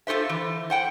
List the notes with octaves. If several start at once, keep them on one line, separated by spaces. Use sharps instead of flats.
F4 F#4 A4 C5 E5
E3
C5 F#5 G5